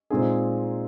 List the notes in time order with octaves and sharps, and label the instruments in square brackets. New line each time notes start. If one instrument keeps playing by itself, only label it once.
[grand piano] A#2 G#3 C4 D#4 G#4